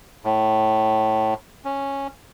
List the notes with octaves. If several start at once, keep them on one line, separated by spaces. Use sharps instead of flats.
A2
C#4